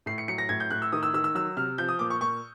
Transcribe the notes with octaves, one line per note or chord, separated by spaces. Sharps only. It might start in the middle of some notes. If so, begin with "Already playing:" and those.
A2 C7
C#7
F#3 C#7
A#6
A2 G#6
G6
A2 F#6
E6
D#3 D#6
E6
D#3 E6
E6
F#3 E6
C3 F6
F3 G6
D#6
A#2 D6
C#6
A#2 C#6